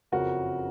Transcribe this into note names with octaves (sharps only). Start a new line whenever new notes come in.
F#1 F2 C#3 F3 F#4 A#4